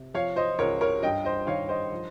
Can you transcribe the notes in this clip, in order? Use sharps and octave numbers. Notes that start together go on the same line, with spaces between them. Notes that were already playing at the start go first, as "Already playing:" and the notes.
Already playing: C3
F3 C#5 F5
C5 D#5
C#2 A#4 C#5
A#4 C#5
G2 D#5 G5
C5 D#5
D#3 C#5 F5
C5 D#5
F3